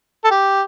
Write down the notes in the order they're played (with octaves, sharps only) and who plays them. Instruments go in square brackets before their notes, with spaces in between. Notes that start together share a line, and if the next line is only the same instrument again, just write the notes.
[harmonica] A4
G4